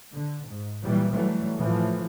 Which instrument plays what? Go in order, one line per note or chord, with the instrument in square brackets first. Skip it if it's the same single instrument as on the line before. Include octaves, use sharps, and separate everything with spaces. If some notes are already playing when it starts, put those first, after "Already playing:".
[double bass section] D3
G#2
A#2 E3 F#3 G3
E3 F#3 G3 A3
A2 E3 F3